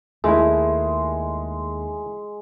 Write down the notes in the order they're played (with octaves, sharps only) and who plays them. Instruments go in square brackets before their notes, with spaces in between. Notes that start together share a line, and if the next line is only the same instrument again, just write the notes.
[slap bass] D#2 [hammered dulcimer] G#3 [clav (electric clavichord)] A3 E4